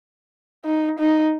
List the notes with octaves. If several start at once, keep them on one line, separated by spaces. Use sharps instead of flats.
D#4
D#4